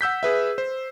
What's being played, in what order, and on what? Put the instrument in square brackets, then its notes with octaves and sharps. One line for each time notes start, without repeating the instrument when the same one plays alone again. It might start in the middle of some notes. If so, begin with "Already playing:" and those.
[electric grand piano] F#5 E6 G6 B6
G#4 B4 E5
C5